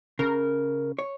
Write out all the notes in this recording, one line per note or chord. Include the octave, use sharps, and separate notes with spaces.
C#3 A#4
C#5